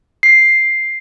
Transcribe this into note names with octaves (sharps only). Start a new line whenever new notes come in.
C7